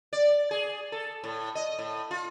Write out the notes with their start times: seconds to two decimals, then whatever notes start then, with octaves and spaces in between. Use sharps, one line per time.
0.13 D5
0.51 G#4
0.92 A4
1.24 A2
1.55 D#5
1.79 A2
2.11 F4